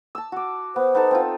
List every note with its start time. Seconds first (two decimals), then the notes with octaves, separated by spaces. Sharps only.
0.15 A5 E6
0.32 F#4 D6
0.76 B3 C5
0.95 B3 D#4 A4
1.11 C4 F4